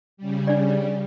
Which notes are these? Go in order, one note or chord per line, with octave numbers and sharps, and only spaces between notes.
C#3 G3
D4 D5